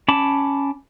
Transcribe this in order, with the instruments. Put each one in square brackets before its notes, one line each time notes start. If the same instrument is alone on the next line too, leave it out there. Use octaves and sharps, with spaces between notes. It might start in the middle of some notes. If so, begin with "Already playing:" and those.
[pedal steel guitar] C#4 A5 B5 D6